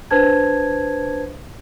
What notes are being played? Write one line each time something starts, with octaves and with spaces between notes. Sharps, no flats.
D4 B4 C5 A5 G#6